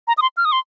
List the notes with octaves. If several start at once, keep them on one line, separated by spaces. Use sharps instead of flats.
A#5
D#6
C6
F6
D#6
C6